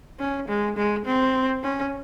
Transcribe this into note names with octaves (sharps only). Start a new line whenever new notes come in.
C#4
G#3
G#3
C4
C#4